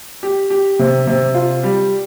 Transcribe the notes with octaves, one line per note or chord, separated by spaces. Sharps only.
G4
G4
C3
C3
F4
G3